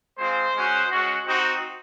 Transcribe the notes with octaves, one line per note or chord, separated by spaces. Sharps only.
G#3 C4 F4 C5
G#3 C#4 F#4
G#3 C#4 F#4
C4 D#4 F#4